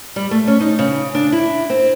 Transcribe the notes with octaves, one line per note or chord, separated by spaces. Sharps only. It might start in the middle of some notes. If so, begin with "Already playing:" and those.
G3
A3
C#4
D#4
C#3
D4
E4
C4